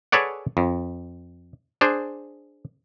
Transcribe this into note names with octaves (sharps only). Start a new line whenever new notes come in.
G#4 A4 B4 C#5 D5 F#5
F2
D4 G#4 C5